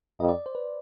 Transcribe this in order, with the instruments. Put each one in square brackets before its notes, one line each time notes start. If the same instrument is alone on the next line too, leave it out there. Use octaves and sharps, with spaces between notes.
[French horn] F2 [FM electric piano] D#5
[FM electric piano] D5
C5
B4